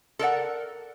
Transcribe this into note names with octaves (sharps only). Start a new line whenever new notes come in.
A4 A#4 D5 F#5